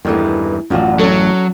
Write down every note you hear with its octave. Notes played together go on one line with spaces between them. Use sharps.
E2 G2 D#3 E3 A3
A1 F#2 D4 F4 F#4
F#3 C#4 A4